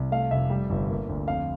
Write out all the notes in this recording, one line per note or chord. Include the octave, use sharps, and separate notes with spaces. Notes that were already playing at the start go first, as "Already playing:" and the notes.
Already playing: C2
A3 F5
F1 E5
G3
G1
A#3
D2
F2 F5